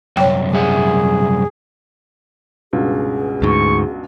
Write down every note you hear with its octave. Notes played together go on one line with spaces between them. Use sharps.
C2 F#2 C#5 G5
G3 G#4 E5 F#5
C#2 G2 B2 G#4
D2 G#2 C#6